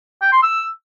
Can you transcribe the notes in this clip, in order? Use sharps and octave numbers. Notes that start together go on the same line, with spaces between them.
G5
C6
E6